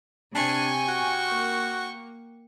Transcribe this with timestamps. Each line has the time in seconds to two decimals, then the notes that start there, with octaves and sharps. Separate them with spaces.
0.35 C3 D4 G5 G#5 C#6
0.88 F#4
1.31 A#3